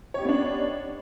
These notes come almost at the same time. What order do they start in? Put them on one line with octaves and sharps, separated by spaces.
C#5 G4 D#4 B3 D4